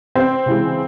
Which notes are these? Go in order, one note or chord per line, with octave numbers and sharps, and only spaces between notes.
C4
C#3 E3 G#3